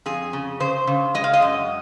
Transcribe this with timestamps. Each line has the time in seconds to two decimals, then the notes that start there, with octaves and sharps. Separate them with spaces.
0.06 F2 G#4
0.33 C#3
0.60 C#3 C5
0.87 C#3
1.15 G#3 D#5
1.24 F5
1.33 D#5
1.42 F#2